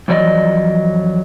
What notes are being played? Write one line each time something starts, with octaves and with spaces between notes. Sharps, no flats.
F2 E3 F#3 D5 D#5